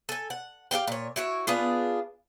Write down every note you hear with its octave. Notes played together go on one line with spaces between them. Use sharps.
A4 G#5
F#5
G4 A4 F5 G5
A#2 C#5
E4 F#4 C#5
B3 D4 F4 G#4